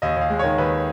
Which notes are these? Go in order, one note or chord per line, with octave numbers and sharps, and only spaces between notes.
D#2 D#5
D#2 F5
G#3
D#3 C#5
D#2 B4